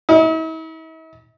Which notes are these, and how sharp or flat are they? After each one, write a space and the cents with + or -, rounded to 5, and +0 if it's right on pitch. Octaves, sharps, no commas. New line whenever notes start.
E4 -45